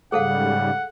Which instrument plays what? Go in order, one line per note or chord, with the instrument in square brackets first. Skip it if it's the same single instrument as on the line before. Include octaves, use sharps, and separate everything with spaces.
[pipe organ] G#2 C#3 G3 [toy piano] G#4 A4 F5 [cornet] F#5